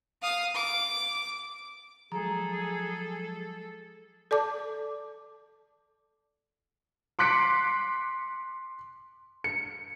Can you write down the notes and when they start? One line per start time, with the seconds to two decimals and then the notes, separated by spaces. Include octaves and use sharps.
0.22 F5 D#6
0.55 D6
2.12 F3 F#3 G#3 G#4 A4 A#5
4.31 A4 D5 A5 D6
7.19 C6 D6 F#6 B6 C#7 D7
9.44 C#7